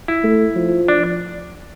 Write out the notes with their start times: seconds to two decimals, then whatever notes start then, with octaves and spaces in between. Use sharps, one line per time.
0.08 E4
0.24 A3
0.56 F3
0.88 D4